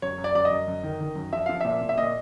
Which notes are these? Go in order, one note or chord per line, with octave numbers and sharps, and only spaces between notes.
F#2 C#5
F#2
D5
F#2 D5
D#5
F#2
F#2
D#3
D#3
F#2
F3 E5
F3 F5
A#2 E5
A#2
E5
A#2 D#5